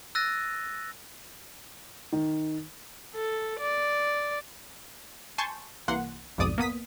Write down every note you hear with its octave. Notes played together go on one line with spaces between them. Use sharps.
E6 F#6 A6 A#6 D#7
D#3
A4
D5
G#5 A5 C6 C#6 G6 A6
C2 E3 A#3 F#5 C6
B1 F2 G#2 D5 D#6 D#7
A#3 B3 D#6 B6